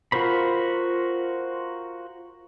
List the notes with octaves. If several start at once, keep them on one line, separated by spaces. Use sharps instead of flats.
F4 F#4 A#4 C5 B5